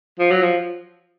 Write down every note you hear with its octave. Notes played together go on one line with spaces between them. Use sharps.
F3
F#3
F3